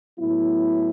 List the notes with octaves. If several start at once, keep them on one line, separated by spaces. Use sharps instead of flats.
A2 F#3 B3 E4